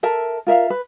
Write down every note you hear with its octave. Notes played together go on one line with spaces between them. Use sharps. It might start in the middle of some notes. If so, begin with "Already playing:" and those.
A4 A#4 E5 A5
F4 A#4 E5 F5
B4